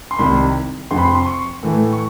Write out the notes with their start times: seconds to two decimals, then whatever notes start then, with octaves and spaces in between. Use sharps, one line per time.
0.11 C6
0.18 C2 C3 D#3 G3 B5
0.91 F2 C3 F3 C6
0.98 B5
1.03 C6
1.15 C6
1.27 C#6
1.63 A2 E3 A3
1.93 C#6